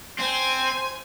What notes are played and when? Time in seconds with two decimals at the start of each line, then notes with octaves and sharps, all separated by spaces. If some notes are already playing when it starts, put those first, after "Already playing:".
0.19 C4 C5 G#5